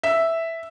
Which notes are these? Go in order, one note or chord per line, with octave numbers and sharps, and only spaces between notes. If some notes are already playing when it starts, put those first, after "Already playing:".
E5